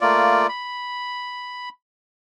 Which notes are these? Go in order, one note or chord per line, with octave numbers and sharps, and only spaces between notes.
A3 A#3 F4 D5
B5